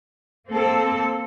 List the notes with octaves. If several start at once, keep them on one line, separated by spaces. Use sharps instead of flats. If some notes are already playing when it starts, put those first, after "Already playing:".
A#3 C4 A4